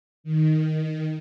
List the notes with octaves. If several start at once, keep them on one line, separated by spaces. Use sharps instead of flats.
D#3